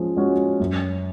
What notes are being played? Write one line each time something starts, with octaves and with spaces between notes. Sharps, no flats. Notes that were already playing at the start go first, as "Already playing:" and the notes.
Already playing: F3 G#3 C#4
G#3 C#4 F#4
F#2